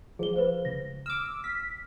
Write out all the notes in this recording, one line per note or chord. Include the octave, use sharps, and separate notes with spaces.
F3 G#4 G7
B4 C5 F5
C#2 A#6
D6 E6 F6
F6 B6